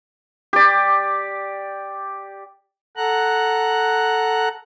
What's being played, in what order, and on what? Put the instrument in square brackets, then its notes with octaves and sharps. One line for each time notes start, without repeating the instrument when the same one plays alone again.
[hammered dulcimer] G4 D5
[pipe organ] A4 F#5 A#5 F#6